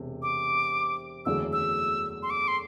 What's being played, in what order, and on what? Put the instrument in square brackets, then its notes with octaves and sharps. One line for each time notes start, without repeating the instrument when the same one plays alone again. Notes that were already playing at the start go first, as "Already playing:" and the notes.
Already playing: [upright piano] E1 C3
[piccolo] D6
[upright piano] F#1 E2 D3 F#3 A3 [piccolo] E6
[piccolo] E6
C6
D6
C6